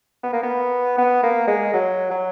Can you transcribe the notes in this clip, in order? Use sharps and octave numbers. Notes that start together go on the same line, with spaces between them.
B3
A#3
B3
B3
A#3
G#3
F#3
F#3